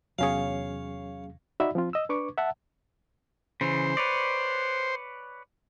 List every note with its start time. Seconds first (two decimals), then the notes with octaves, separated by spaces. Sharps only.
0.19 E2 C3 F#3 B3 C#4 G#4 C#5 F5
1.60 D#4 F#4 D5 E5 B5
1.75 F3 C4 F4
1.93 D#5 E6
2.09 D4 B4 C#6 D6
2.38 E5 F#5 A5
3.61 C#3 E3 C5
3.97 B4 C#5 D5